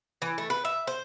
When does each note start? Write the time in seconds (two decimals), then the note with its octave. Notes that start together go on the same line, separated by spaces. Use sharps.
0.22 E3
0.38 A3
0.50 B4
0.65 E5
0.87 C5